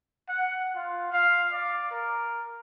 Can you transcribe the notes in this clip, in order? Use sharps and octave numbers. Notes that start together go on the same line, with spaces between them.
F#5
F4
F5
D5
A#4